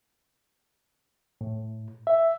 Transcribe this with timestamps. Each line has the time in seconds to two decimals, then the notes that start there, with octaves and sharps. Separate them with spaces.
1.41 A2
2.07 E5